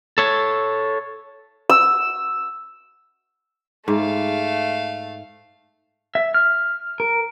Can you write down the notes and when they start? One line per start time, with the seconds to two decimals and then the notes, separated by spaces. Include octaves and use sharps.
0.18 A4 C#5
1.69 E6
3.88 G#2 A3 F5
6.15 E5
6.34 F6
7.00 A#4